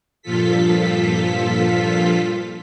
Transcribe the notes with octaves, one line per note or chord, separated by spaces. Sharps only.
G2 A#2 F3 F4 A4 B6